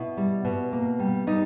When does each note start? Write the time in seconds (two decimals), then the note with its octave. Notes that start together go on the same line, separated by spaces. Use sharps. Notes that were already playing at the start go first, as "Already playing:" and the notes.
Already playing: B2 E4
0.17 G3
0.45 B2
0.73 A#3
0.99 G3
1.27 G3 D#4